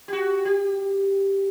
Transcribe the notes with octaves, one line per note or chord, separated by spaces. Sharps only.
F#4 G4
G4